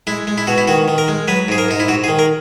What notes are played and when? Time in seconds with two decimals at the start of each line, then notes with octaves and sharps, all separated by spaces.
0.07 G#3 E4
0.27 G#3
0.38 E4
0.47 B2 F#4
0.58 E4
0.67 D#3 F#4
0.88 D#3
0.98 A#4
1.08 G#3
1.28 F#3 B4
1.48 G#2 G#4
1.58 A#4
1.68 G#2 D#4
1.80 E4
1.88 G#2 F#4
2.04 G#4
2.08 D#3
2.19 A#4